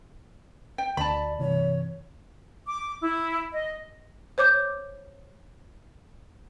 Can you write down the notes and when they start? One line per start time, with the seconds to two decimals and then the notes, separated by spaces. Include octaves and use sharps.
0.78 G5
0.97 D2 D5 A5 B5
1.39 G2 C3 E3 C#5
2.66 D6
3.01 E4
3.53 D#5
4.38 C5 C#5 D6 G6